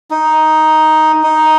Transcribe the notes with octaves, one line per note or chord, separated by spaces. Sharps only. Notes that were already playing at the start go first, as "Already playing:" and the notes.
D#4
D#4